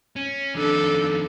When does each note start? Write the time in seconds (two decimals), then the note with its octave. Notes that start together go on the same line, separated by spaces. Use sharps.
0.16 C#4
0.55 F2 D#3 D4 A4